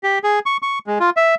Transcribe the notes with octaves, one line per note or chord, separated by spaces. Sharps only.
G4
G#4
C#6
C#6
G#3
F4
E5